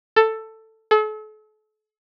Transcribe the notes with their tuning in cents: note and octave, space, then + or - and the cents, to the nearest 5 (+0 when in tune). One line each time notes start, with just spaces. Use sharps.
A4 +10
A4 -40